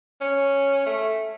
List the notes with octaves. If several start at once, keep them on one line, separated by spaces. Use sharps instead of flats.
C#4
A3